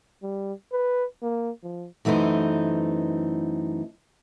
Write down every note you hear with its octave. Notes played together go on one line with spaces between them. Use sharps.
G3
B4
A#3
F3
F#2 E3 A3 D#4 C5